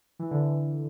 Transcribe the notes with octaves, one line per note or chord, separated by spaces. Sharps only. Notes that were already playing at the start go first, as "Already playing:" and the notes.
E3
D3